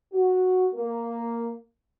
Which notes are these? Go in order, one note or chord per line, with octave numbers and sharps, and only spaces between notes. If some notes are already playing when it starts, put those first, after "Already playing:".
F#4
A#3